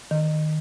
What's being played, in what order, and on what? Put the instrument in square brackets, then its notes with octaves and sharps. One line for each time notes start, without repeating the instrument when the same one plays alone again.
[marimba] D#3